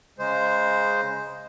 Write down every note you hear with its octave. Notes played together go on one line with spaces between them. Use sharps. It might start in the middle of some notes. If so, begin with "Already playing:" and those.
C#3 G#3 C5